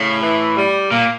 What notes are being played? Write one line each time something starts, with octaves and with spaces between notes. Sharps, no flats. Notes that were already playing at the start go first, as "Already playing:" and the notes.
Already playing: A2 C#3
E3
G3
A#2 A#3